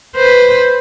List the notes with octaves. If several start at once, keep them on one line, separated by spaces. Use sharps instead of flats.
B4 C5